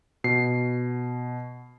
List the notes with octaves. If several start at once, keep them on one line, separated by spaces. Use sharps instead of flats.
B2 C7